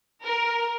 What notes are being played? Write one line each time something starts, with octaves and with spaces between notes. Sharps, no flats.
A#4